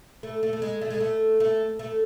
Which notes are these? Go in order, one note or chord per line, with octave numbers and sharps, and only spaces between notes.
A3
A3
A3
G#3
A3
G#3
A3
A3
A3